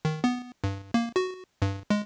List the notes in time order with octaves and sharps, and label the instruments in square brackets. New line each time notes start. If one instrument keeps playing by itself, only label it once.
[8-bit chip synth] D#3
B3
G2
A#3
F#4
G2
G#3